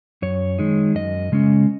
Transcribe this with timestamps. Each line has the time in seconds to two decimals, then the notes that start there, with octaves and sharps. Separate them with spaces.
0.22 F#2 C#5
0.59 D#3 G#3 D#4
0.95 F#2 D#5
1.32 C#3 G#3 C#4